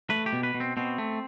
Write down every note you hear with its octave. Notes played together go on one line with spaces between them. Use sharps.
A3 B4
G4
B2
B4
B2
C4
B2 C4
A3